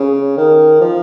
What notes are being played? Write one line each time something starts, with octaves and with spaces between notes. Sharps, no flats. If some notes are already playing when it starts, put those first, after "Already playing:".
Already playing: C#3
D#3
F3